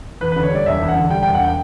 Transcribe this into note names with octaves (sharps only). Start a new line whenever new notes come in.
E2 B4
D3 B4
C#5
G3 D5
E1 E5
E2
F#5
D3
G3 G5
E1 G5
F#5
G5